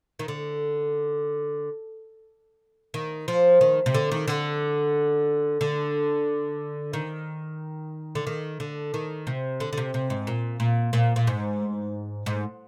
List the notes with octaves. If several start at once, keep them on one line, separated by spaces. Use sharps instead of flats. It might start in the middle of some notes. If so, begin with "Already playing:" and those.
D#3
D3
D#3
F3
D#3
C3
D3
D#3
D3
D3
D#3
D3
D#3
D3
D#3
C3
D3
D3
C3
C3
G#2
A#2
A#2
A#2
A#2
G#2
G#2